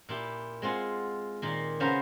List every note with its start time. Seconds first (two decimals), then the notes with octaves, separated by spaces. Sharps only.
0.09 A#2 E4 G4
0.62 G#3 C4 F4 F#5 G#5
1.42 A#2 D#3 A#3
1.80 C#3 B3 C#4 C5 F5 A#5